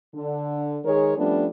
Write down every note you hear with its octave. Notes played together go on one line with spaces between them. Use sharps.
D3
D#3 G#3 G#4 A#4 C#5
F3 G3 A3 B3 C#4 D4